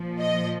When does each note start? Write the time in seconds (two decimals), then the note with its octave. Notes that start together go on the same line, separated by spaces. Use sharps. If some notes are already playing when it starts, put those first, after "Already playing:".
Already playing: A#2 F3
0.20 D#5